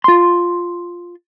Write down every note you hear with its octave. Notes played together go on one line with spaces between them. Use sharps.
F4 C6